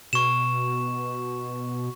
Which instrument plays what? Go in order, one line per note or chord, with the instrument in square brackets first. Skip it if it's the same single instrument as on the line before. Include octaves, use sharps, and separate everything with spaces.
[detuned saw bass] B2 [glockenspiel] C#6 E7